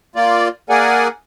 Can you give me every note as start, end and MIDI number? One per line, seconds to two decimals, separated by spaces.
0.16 0.48 58
0.16 0.48 65
0.16 0.48 74
0.70 1.08 58
0.70 1.08 68
0.70 1.08 70
0.70 1.08 74
0.70 1.08 78
0.70 1.08 80